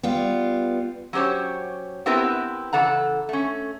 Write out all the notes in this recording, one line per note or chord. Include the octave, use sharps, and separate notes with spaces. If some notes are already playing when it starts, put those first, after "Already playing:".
G3 B3 F4
F#3 C#4 G4 C5 C#5
B3 C4 E4 G4 A#4 B4
C#3 E3 A4 F#5 A#5
A3 C#4